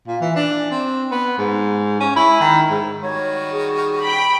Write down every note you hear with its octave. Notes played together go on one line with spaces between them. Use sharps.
A#2
E3
D4
C4
B3
G#2
C#4
E4
D#3
G#2
D#3 G3 F#4 C#5
G#4
G5 B5